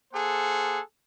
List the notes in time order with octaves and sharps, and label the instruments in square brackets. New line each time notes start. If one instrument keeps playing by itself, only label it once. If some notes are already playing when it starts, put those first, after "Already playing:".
[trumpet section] A#3 G#4 A4 C5 F#5